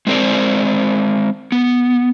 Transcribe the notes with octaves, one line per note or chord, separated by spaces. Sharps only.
G#3 A3 C4 A#4 C5 D5
B3